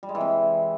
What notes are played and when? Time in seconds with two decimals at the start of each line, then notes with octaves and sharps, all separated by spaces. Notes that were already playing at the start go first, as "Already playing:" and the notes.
0.03 G3
0.09 G#3
0.15 E3
0.21 C3